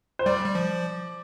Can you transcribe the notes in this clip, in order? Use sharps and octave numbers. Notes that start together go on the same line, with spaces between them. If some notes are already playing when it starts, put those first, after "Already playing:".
C5
G3 D5
G3
F3